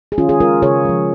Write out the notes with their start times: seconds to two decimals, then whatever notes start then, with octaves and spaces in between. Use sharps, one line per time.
0.12 G#4
0.18 D#3 C#4 F4
0.29 G#4
0.40 G#3 F4 A#4
0.62 C#3 G#4 C#5
0.85 F3 G#3